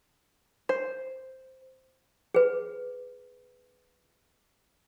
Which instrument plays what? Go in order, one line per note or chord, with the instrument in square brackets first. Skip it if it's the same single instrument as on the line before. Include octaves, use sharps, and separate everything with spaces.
[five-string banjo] C5
[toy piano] G#4 B4